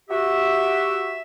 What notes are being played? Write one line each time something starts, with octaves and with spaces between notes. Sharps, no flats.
F#4 G4 E5